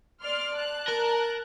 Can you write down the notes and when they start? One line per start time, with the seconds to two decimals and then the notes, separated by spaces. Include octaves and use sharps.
0.23 D5 C6 F6
0.57 A5 F#6
0.88 A#4